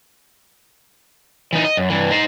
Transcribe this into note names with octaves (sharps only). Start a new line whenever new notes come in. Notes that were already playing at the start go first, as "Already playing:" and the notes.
E3 D#4
D#5
F#2
G2 E3
D#4 C5